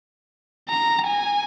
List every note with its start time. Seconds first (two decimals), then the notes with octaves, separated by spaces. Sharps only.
0.69 A#5
1.06 G#5